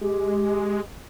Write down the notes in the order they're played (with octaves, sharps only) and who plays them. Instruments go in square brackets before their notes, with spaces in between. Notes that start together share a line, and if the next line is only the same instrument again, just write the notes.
[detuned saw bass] G#3 [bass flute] G4